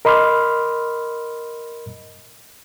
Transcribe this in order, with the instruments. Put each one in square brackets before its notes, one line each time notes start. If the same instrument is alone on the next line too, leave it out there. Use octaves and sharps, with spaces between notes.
[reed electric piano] A#4 D#5 B5 C6 D6 F6